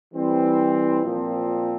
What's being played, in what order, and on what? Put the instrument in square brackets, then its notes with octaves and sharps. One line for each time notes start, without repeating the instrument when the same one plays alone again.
[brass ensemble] E3 G3 C4
A#2 F3 C4